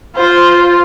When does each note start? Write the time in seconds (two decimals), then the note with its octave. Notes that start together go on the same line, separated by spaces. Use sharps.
0.16 F4 C5